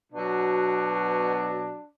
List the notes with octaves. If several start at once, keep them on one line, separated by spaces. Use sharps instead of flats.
B2 F#3 D4